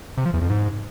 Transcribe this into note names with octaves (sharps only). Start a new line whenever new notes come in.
C3
F3
E2
F2
G#2